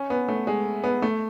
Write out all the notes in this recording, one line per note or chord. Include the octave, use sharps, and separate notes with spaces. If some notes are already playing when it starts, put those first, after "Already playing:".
Already playing: C#4
B3
A3
G#3
B3
A3